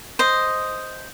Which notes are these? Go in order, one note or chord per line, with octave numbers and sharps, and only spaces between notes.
C5 D#5